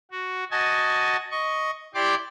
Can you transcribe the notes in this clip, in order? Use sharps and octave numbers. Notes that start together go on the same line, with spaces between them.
F#4
F#4 D#5 G#5 A5
D#5 C#6
E4 G4 D5 G5 C6 D6